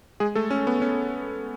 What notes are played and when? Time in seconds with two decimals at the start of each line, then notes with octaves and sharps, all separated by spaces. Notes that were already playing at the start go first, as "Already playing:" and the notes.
0.20 G#3 G#4
0.35 A3 A4
0.51 C#4
0.67 B3
0.82 C#4